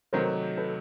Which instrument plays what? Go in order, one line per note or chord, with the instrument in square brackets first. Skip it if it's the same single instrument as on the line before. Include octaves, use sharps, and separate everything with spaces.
[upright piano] C3 D#3 F#3 A3 [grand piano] A#4 C5
[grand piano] A4 B4